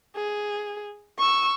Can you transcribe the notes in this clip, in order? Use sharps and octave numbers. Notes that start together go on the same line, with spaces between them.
G#4
C#6 E6